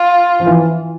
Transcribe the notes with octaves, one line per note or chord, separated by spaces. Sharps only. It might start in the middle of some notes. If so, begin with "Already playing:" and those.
Already playing: F4
F3
E3